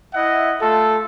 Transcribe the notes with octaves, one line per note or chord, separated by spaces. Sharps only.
E4 D#5 E5 F#5
A3 F4 A4